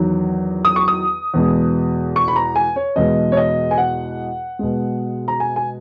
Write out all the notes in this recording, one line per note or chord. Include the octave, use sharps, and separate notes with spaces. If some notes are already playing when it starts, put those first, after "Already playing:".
Already playing: E2 D#3 F#3
D#6
C#6
D#6
E2 B2 G#3
C#6
B5
A#5
G#5
C#5
E2 B2 G#3 D#5
C#5
D#5
G#5
F#5
B2 G#3
A#5
G#5
G#5